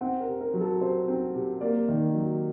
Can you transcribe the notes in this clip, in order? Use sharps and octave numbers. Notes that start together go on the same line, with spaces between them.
C4 F#5
A#4
C3
A#4
F#3
A4
C3 C5
C4
C3
A#3 D5
D#3
F#3